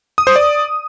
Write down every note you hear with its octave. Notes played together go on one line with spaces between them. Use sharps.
D#6
C5
D5